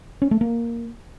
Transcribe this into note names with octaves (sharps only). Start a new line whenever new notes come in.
C#4
A3
A#3